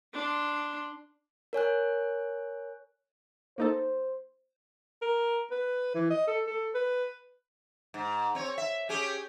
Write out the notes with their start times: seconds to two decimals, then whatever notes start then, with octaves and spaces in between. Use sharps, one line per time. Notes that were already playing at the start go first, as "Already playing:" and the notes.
0.13 D4 C6
1.53 A#4 C#5 G#5 F#6
3.58 A#3 D#4 A4 C5
5.02 A#4
5.51 B4
5.95 E3
6.10 D#5
6.28 A4
6.47 A4
6.75 B4
7.94 G#2
8.35 C4 C#5
8.58 E5
8.89 C#4 G4 G#4